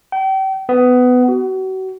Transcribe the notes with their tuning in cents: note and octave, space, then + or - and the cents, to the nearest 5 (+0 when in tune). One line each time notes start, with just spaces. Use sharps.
G5 -35
B3 +15
F#4 +35